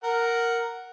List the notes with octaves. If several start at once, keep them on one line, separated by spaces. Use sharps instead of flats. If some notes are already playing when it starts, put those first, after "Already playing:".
A#4 F#5